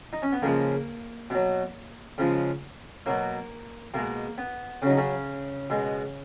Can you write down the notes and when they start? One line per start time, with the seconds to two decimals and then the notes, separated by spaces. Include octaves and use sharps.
0.13 D#4
0.22 C#4
0.33 B3
0.42 C#3 F3 G#3 A#3
1.30 B2 F#3
2.18 C#3 F3 G#3
3.06 B2 F#3 A#3
3.94 B2 G#3 A#3
4.38 B3
4.82 C#3 C#4
4.86 F#3 D#4
4.97 C#3 C#4
5.70 B2 G#3